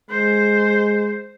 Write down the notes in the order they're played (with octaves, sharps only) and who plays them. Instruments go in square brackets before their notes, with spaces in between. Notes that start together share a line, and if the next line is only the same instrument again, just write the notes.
[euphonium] G#3 [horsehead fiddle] C5